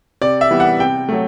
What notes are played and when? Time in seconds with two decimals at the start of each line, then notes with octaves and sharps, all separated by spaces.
0.22 C3 D5
0.41 E5
0.51 E3 G3 B3
0.60 F#5
0.79 C3 G5
1.09 F#3 A3